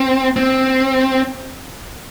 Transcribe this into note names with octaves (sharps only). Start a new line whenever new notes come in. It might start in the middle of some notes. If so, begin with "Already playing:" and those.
Already playing: C4
C4